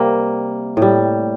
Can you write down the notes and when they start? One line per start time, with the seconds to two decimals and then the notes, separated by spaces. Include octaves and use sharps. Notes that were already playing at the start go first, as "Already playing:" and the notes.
Already playing: C3 G3 A#3
0.77 A2 G3